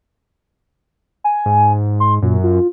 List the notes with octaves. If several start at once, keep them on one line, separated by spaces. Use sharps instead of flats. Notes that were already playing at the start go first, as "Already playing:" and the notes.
G#5
G#2
C6
F#2 A#2
F4